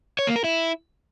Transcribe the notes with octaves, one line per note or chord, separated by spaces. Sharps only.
C#5
A#3
A#4
E4